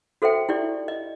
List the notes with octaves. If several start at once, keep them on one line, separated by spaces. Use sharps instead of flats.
F#4 A4 C5 E5 G5
E4 G4 D5
D#5